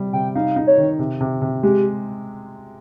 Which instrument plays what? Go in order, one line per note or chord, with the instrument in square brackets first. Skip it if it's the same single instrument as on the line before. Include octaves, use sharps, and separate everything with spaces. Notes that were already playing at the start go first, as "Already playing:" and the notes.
Already playing: [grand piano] C3 G3
[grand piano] C3 [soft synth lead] G5
[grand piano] D#4 [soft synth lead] F5
[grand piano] D#4
[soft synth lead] C#5
[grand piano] D#3
C3
C3
C3
[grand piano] G#3 [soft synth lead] G4